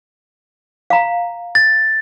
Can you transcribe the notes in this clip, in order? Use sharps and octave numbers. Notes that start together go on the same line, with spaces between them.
F5 A#5
A6